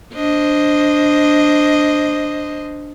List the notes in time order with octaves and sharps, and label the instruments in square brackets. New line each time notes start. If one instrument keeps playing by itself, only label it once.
[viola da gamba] D4 C5 D#5